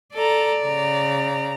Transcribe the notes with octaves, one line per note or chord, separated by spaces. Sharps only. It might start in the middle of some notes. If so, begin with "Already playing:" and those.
A4 D5 A#5
C#3 A#5